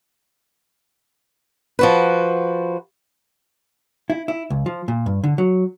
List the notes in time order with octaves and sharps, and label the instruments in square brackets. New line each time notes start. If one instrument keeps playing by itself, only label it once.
[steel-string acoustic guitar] F3 F#4 B4
[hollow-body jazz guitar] E4
E4
C#2
F3
A#2
G2
D3
F#3